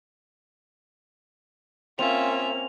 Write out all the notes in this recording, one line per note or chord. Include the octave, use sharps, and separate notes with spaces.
A#3 C4 C#4 F4 E5 F7